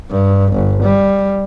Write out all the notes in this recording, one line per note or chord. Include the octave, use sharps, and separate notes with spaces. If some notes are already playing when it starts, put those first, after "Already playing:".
G2
G1
G3